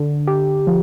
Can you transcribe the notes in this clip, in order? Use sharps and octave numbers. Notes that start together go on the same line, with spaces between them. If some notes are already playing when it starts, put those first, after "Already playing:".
Already playing: D3
G4
F3